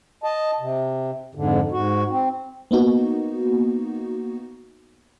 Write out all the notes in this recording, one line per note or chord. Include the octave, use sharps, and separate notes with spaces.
D#5 A5
C3
F2 G#2 D3
G#2 F#4
C4
A#3 B3 D#4 F#4